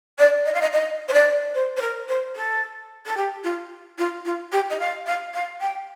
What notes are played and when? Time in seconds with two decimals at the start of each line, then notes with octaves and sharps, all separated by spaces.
0.18 D5
0.45 D#5
0.53 F5
0.61 D#5
0.72 D#5
1.08 C5
1.13 D5
1.54 C5
1.76 C5
1.81 A#4
2.08 C5
2.35 A4
3.05 A4
3.16 G4
3.44 F4
3.98 F4
4.25 F4
4.52 G4
4.70 D#5
4.79 F5
5.06 F5
5.33 F5
5.60 G5